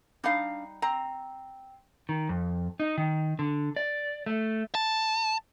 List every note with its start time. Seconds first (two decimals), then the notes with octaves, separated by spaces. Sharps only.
0.24 G3 D4 D#4 F5 F#5
0.82 C4 A#5
2.09 D#3
2.29 F2
2.80 D#4
2.98 D#3
3.39 D3
3.76 D5
4.26 A3
4.75 A5